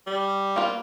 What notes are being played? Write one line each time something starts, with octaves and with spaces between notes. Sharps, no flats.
G3
A#3 B3 F4